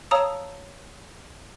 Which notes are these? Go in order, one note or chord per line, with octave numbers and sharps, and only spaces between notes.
C#5 F5 A5 A#5 D#6 E6